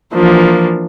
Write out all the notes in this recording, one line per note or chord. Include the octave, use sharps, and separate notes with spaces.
E3 F3 A#3 D4